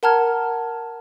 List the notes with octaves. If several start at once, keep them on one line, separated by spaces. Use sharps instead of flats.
A#4 F#5 A5 A#5 F6 G#6